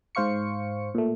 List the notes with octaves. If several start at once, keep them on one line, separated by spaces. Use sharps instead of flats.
G#2 C5 F5 C#6 C#7
A#2 A3